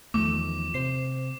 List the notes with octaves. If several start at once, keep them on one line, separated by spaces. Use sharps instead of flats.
E2 D#3 F3 A3 D6
C3 C5 C7